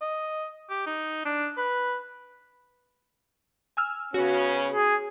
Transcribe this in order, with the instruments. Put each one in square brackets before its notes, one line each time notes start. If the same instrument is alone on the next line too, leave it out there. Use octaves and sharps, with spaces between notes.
[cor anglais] D#5
G4
D#4
D4
B4
[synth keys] G#5 E6 F6
[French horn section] C#3 B3 C#4 [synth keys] F#4
[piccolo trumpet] G#4